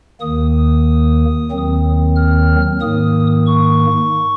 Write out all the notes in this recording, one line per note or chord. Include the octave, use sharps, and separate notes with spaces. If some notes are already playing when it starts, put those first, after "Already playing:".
D#2 D#3 A#3 D#6
D#2 D#3 F#3 C4
F6
G#2 D#3 A#3 D#6
C#6